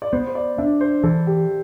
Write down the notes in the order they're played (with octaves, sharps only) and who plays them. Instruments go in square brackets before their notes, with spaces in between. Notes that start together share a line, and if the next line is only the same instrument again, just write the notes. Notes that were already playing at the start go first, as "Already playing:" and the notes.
[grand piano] D5
[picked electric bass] B3 [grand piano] C5
[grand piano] C5
D5
[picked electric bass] D4 [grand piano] E5
[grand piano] C5
[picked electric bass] E3 [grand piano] A4
[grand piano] G4